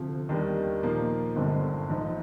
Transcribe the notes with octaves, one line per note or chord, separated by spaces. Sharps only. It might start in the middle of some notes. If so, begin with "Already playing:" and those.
Already playing: D2 C3 F3
D#2 D#3 G3 D4
A#2 F3 A#3 D#4
G1 G2 D3 G#3 C4
A#1 G#2 F3